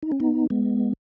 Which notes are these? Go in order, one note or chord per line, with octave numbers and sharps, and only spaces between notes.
D#4
C#4
B3 D#4
G#3 B3